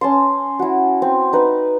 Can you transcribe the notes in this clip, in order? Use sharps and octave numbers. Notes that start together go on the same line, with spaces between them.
C#4 A5 C6
E4 F#4
C4
D#4 B4